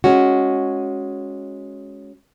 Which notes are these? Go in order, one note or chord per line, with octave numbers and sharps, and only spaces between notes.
G#3 C#4 F#4